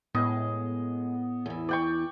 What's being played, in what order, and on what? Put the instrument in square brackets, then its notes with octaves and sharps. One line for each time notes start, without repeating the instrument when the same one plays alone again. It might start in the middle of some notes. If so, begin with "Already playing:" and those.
[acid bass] A2 [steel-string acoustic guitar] G#3 [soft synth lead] B3 [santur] D#5
[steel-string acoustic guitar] E2 E3
[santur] D5 G5 C#6